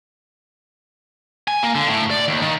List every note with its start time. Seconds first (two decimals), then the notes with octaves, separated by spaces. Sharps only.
1.48 G#5
1.63 A#3
1.75 D3
1.87 A2
2.10 D5
2.28 D#2
2.42 D#3